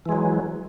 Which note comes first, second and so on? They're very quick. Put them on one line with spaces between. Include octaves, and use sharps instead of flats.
E3 G#3 F#3